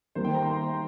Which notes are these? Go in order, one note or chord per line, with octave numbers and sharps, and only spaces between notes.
D#3 G3 A#3 C5
G5
A#5
C6